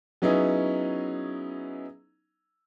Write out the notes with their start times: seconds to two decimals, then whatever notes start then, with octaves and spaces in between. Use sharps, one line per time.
0.22 F#3 B3 C#4 D#4 E4 G#4